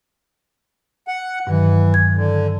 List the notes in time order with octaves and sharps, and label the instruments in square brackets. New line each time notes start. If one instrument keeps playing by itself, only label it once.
[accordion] F#5
[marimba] G2 D#3 F#3 [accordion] E3
[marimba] G#6
[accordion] D3